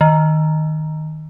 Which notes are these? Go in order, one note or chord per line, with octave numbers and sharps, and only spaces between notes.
D#3